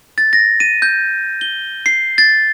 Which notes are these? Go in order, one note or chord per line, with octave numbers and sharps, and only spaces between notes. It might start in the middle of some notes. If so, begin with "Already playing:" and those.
A6
A#6
D#7
G6
G7
C7
A6